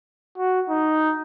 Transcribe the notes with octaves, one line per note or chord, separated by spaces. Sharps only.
F#4
D#4